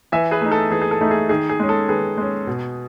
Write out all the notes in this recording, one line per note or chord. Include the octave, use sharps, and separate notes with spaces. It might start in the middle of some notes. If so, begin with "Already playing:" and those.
E3 E5 G#5
G#4 B4
A3 D#4
A4
E3 G#4
G#4
A4
A3 D#4
G#4
D#3 G#4
G#4
G#3 C#4
A4
D#3 G#4 B4
G#3 C#4
B2